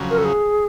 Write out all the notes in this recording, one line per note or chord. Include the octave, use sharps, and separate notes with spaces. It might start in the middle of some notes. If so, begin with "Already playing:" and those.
Already playing: F2 C#3 F#3
A#4
A4
G#4